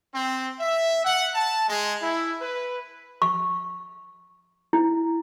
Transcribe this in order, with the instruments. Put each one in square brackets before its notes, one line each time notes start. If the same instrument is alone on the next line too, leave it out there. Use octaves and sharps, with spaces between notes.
[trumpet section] C4
E5
F#5
A5
G#3
E4
B4
[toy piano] C#6
E4